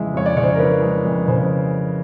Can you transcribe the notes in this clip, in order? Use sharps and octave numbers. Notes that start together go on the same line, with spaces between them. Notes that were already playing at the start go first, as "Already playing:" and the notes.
Already playing: F2 C#3 E3 G#3 E5
F2 C#5
D5
C#3 C#5
C5
A#4
E3 B4
G#3
F2
C#3 C5